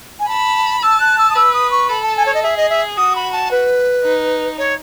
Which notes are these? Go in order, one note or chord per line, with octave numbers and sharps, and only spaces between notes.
G#5
A5 B5
A5 E6
F#6
E6
D#6
B4 E6
D#6
C#6
A4 B5
A5
G#5
C#5
D#5
G#4 E5
D#5
E5
F#4 D#6
B5
A5
B4
D#4
C#5